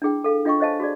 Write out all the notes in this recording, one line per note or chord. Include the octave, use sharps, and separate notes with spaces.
D4 E4 G#4 G5
A4 F5
D4 F4 D#5 G5 B5 C#6
C5 C#5 D#5 F5 G#5 A5
F#4 G#4 D5